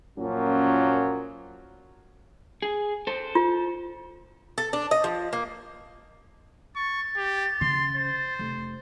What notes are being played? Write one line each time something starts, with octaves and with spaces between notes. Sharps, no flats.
F#2 A#2 F3 F#3 A#3 C#4
G#4
A4 C5
F4
A4
D4
D#5
F3
A#3
C#6 A6
G4
C#3 C6
C5
F1